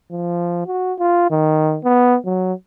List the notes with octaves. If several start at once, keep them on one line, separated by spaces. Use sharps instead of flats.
F3
F#4
F4
D#3
B3
F#3